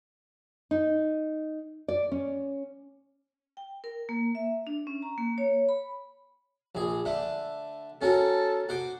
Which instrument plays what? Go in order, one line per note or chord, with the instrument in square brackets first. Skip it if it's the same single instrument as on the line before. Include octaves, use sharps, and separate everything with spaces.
[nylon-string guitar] D#4
D5
C#4
[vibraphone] G5
A#4
A#3
E5
D4
C#4
A#5
A#3
C#5
B5
[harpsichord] A#1 G#4
D3 A3
[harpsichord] C#4 F#4 A#4 [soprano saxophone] A4
[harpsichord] F#4 C5 D6